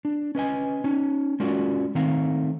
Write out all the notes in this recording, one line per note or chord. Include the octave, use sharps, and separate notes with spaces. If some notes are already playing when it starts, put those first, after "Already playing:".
D4
C#4 B4 D#5 G#5
C#4 D#4
G#3 C#4 F4 F#4 A#4 D5
D#3 A3 C4 D#4 F5 A#5